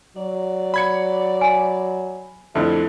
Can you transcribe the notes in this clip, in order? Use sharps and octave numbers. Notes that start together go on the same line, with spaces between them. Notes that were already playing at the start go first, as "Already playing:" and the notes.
F#3 D5
B5 G#6 C#7
G#5
F2 D3 A3 E4